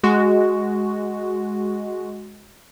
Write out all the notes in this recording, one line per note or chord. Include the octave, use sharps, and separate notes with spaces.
G#3 F#4